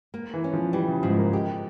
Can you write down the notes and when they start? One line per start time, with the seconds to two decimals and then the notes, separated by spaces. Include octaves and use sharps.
0.14 A#3
0.34 E3
0.44 C#4
0.53 F3
0.73 E3 G3
0.88 C#3
1.03 G#2 F3
1.18 A#3
1.33 G#3 G4